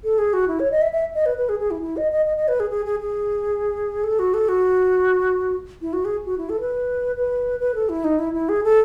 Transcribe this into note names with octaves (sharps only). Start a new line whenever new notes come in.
A4
G#4
F#4
E4
C#5
D#5
E5
E5
D#5
B4
B4
G#4
G#4
E4
E4
D#5
D#5
D#5
D#5
B4
G#4
G#4
G#4
G#4
A4
F#4
A4
F#4
E4
F#4
G#4
F#4
E4
A4
B4
B4
B4
A4
E4
D#4
E4
E4
G#4
A4